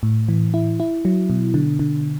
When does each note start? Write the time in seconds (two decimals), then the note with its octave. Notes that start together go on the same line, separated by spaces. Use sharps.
0.03 A2
0.29 E3
0.54 E4
0.80 E4
1.05 F#3
1.30 B2
1.54 D3
1.79 D3